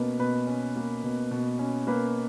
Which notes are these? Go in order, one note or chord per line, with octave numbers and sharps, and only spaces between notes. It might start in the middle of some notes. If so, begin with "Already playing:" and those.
Already playing: B2 A#3 C#4 B4
B2 B4
C#4
A#3
B2
B2
C#4
A#3 B4